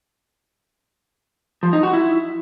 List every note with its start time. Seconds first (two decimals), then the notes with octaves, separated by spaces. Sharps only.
1.63 F3
1.73 D#4
1.83 F#4
1.93 E4